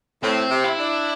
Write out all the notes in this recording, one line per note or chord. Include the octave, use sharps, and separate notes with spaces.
A2 C4
C3
E4
D4